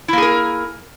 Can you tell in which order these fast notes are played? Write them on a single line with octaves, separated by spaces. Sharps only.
E4 A#3 G#4 A#4